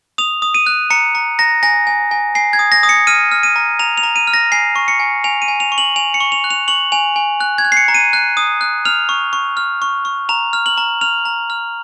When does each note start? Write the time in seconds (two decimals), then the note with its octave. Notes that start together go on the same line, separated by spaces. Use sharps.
0.18 D#6 F7
0.42 D#6
0.54 D#7
0.66 F#6
0.90 A#5 C#7
1.15 A#5
1.39 A#5 A#6
1.63 G#5 A#6
1.87 G#5
2.11 G#5
2.35 G#5 C7
2.53 G#6
2.59 D#6
2.72 A#6
2.83 D#6
2.89 C#7
3.07 F6 D#7
3.32 F6
3.43 D#7
3.56 A#5
3.79 A#5 F7
3.98 F7
4.03 A#5
4.16 D#7
4.28 F6
4.34 A#6
4.52 G#5 C7
4.76 C#6
4.88 C#7
5.00 G#5
5.24 G#5 F7
5.42 D#7
5.48 G#5
5.60 F7
5.72 C#6
5.78 F#7
5.96 G#5 F7
6.14 C#7
6.20 C#6
6.32 F7
6.44 F#6
6.51 F7
6.68 C#6 F#7
6.92 G#5 F7
7.16 G#5
7.41 F#6
7.58 G#6
7.65 F#6
7.72 C7
7.77 C#7
7.88 A#5
7.94 D#7
8.13 F#6
8.37 D#6
8.61 F#6
8.85 F6 F7
9.09 C#6
9.33 C#6
9.57 F6
9.82 C#6
10.05 C#6
10.29 A#5 F7
10.53 F6
10.66 F#7
10.78 A#5
11.01 F6 F7
11.25 A#5
11.50 F6